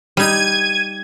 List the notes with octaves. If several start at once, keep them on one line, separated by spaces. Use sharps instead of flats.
G3 D#4 G#6 D#7